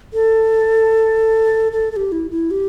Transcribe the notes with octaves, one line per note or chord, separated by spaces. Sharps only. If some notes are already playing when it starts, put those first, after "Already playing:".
A4
A4
A4
G4
E4
E4
G4